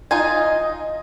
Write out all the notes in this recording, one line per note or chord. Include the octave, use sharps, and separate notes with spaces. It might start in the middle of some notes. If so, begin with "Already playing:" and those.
D#4 F4 D#5 G#5